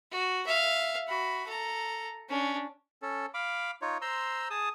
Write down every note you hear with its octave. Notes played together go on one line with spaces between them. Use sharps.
F#4
E5 F5
F#4 B5
A4 A#5
C#4 D4
C#4 A4
F5 B5 D6
D#4 F4 C#5
C5 A#5 C6 E6
G#4 A5 D#6